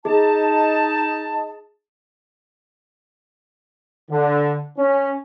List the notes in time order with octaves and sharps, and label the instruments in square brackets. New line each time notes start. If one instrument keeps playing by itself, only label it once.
[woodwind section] D#4 A5 [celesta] G#4
[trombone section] D3
C#4